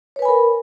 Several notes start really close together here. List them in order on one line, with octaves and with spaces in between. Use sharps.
C#5 B4 G#5 B5 A#4